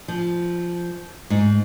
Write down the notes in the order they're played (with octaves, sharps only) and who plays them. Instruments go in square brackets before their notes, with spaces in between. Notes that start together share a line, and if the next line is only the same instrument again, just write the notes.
[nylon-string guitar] F3
G#2